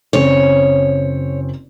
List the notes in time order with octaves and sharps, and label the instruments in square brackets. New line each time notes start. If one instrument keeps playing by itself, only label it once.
[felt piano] F#1 C4 C#4 [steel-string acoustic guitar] C#5